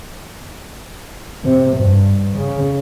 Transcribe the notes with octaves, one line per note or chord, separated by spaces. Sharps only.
C3
G2
C#3